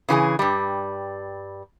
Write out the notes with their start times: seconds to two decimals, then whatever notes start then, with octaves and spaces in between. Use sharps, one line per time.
0.09 C#3 E3 G4 G#4
0.39 G2 G3